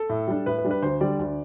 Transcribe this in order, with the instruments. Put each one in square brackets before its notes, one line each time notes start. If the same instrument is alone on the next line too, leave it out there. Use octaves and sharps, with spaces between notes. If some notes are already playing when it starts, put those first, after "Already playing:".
Already playing: [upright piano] A4
A2
G3 D4
A2 B4
B4
G3 D4
B4
D2 C5
D3 G3 D5
D2